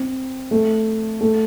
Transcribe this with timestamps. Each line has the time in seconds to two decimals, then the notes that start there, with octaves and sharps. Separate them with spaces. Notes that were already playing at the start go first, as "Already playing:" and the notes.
Already playing: C4
0.51 A3
1.21 A3